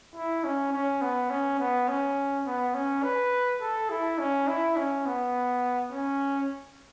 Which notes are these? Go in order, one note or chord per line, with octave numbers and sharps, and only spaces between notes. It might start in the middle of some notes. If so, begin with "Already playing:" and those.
E4
C#4
C#4
B3
C#4
B3
C#4
B3
C#4
B4
A4
E4
C#4
E4
C#4
B3
C#4